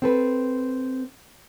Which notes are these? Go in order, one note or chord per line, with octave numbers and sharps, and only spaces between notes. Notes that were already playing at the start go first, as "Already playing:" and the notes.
C4 A4 B4